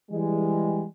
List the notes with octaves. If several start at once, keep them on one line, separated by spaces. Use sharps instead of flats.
E3 G3 G#3